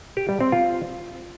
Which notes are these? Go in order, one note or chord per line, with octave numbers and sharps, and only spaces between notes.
G4
G3
C4
F4